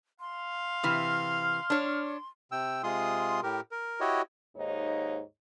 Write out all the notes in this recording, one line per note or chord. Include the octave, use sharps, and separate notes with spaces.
F5 C6
C3 E3 F6
D4 C#5
C3 G5 E6
C3 G#3 F4 G#4 C6 D#6
A2 G4 A#4
A#4
E4 F#4 G4 C#5 D#5
D#2 G#2 D#4 C#5